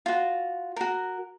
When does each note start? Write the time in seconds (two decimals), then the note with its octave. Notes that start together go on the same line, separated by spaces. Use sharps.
0.06 F4 F#4
0.76 F#4 A#4